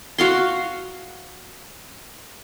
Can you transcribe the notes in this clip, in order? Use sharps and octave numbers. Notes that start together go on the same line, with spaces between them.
F#4 F5 C6